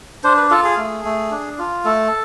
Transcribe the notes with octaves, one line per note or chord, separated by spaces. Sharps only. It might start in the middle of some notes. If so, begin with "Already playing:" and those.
D4 C5
B4
F4 A4
G#4
A3
A3
D4
F4
A3 A4